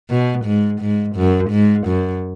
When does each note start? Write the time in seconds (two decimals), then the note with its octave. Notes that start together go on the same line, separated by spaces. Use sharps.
0.10 B2
0.45 G#2
0.81 G#2
1.16 F#2
1.51 G#2
1.87 F#2